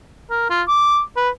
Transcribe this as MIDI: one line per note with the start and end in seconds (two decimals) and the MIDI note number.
0.31 0.45 70
0.50 0.62 65
0.68 1.00 86
1.17 1.29 71